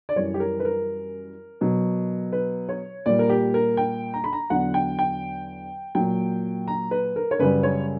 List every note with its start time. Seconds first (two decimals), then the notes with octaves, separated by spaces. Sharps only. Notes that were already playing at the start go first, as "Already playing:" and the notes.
0.09 D5
0.16 F#2 E3 G3 C#5
0.34 G4
0.40 A#4
0.60 B4
0.65 A#4
1.61 B2 F#3
2.32 B4
2.69 C#5
3.06 A#2 G3 D5
3.19 A#4
3.30 G4
3.54 A#4
3.77 G5
4.14 A#5
4.24 B5
4.33 A#5
4.50 E2 D3 F#3 F#5
4.74 G5
4.99 G5
5.95 A#2 F#3 G5
6.68 A#5
6.91 B4
7.16 A#4
7.31 C#5
7.39 F#2 C#3 G3 B4
7.63 C#5